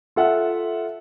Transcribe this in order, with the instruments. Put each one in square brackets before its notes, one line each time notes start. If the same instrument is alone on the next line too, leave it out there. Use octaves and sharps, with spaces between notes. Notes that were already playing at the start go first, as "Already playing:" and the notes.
[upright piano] F4 A4 E5 F#5